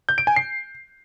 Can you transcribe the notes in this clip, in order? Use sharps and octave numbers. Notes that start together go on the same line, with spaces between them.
G6
D7
G#5
C7